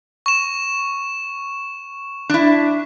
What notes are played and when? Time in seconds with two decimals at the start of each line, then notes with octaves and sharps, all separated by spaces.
0.26 C#6 E7
2.29 D4 E4